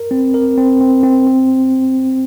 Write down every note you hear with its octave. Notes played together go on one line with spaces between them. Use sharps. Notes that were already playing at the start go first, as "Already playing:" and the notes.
Already playing: A#4
C4
A#4
C4
C4
C4
C4